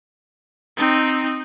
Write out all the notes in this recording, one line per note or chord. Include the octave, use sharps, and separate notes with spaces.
C4 D#4